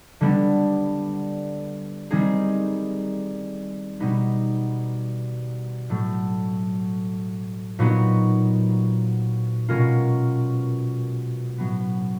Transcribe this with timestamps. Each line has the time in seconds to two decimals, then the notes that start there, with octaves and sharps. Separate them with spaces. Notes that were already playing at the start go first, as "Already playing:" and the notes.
0.21 D3 G3 B3 D4
2.11 D#3 G3 C4 D#4 G#4
4.00 B2 G3 B3 D#4
5.89 A2 F#3 A3
7.79 A#2 F#3 B3 D#4 F#4
9.69 B2 G#3 C#4 F4 A#4
11.58 A2 F#3 B3